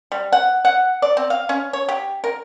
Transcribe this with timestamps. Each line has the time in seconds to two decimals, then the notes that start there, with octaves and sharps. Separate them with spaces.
0.12 G3
0.32 F#5
0.65 F#5
1.02 D5
1.17 C4
1.30 F5
1.49 C#4
1.73 C#5
1.89 G4
2.24 A#4